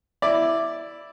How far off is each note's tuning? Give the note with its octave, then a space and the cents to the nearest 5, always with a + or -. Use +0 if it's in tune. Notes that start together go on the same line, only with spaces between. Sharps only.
E4 +0 D5 +0